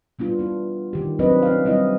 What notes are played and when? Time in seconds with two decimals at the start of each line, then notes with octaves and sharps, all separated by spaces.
0.19 G3 B3 D4 F4
0.39 B3 E4
0.93 D#3 G4
1.19 F#3 C4 D4 B4 D#5
1.43 C#4 F5
1.65 G3 C4 E4 D#5